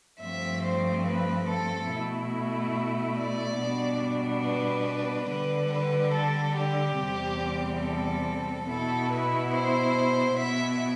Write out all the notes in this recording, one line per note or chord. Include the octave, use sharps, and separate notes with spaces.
G2 F3 A3 C4 E5
C5
B4
A4
B2 A3 E4
D5
B2 G3 B3 D4
B4
D3 G3 D4 B4
B4
A4
G4
E2 C3 G3 C4
A4
B2 B3 E4 A4
B4
C5
B2 B3 E4 E5